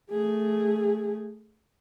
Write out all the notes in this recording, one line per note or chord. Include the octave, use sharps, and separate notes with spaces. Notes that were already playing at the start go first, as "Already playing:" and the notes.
A3 G#4